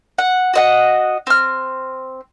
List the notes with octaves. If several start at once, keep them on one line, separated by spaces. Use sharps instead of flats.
F#5
F#4 D#5 F#5
C4 F6